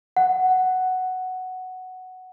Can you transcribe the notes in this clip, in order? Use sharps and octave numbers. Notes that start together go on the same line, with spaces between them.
F#5